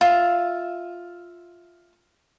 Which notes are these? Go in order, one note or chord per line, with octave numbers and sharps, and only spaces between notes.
F4 E5